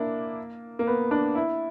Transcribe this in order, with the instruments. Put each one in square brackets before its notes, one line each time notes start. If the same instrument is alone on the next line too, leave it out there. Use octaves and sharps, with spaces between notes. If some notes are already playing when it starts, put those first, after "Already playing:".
Already playing: [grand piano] A#3 D4 E4
A#3
B3
D4
E4